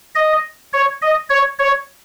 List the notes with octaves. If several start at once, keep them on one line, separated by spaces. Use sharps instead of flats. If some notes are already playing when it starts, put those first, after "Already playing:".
D#5
C#5
D#5
C#5
C#5